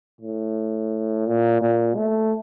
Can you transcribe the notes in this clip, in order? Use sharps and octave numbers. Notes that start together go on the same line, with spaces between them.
A2
A#2
A#2
A3